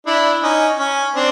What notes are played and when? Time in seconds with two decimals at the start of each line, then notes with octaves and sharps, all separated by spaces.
0.06 D4 E4
0.43 C#4 D#4
0.79 C#4
1.16 C4 D4